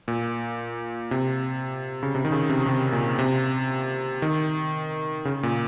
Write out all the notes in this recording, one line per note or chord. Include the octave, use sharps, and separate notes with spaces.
A#2
C3
C#3
C3
D#3
C#3
C3
C3
A#2
C3
D#3
C#3
A#2